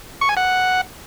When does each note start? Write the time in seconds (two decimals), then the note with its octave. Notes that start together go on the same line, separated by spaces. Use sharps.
0.21 C#6
0.29 G#5
0.37 F#5